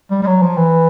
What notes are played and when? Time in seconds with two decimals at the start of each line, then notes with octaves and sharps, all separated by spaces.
0.11 G3
0.22 G3
0.26 F#3
0.42 F3
0.57 E3